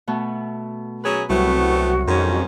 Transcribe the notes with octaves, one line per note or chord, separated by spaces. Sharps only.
B2 A3 B3
F#3 C#4 G#4 B4 G#5
C2 F#3 A3 B3 C4 E4 F#4
F2 G#2 D#3 C#4